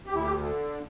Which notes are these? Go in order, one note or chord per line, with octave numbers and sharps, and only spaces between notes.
D2 G4
E4
G4
D3